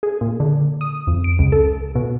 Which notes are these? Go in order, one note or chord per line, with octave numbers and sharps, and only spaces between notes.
G#4
A#2
D3
D#6
F2
D7
C#2
A4
B2